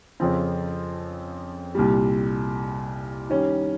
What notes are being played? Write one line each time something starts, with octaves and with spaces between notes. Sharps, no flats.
F2 C#3 F3 C4 F4
C2 A#2 G3
D#3 G3 C#4